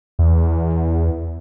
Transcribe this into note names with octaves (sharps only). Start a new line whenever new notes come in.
E2